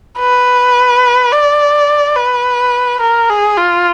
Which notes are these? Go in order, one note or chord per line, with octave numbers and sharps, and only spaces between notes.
B4
D5
B4
A#4
G#4
F4